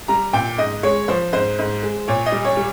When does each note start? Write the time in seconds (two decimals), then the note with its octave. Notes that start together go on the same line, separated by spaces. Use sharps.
0.08 G3 A#5
0.33 A#2 G5
0.58 G#2 D#5
0.83 G#3 C#5
1.08 F3 C5
1.33 G#2 C5
1.59 G#2
1.83 G#3
2.08 A#2 C#5
2.26 D#5
2.32 G3
2.45 C#5
2.57 G3